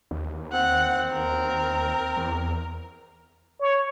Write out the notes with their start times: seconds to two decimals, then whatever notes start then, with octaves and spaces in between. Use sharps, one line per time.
0.11 D#2
0.53 C4 F#5
1.14 A#4
2.17 E2
3.61 C#5